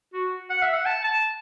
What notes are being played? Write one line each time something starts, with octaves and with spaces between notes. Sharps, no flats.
F#4
F#5
E5
F#5
A5
A5